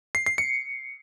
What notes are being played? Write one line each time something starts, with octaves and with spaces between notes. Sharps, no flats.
C7
C7
C#7